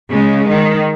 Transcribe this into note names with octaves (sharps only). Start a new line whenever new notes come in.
C#3 G#3
D#3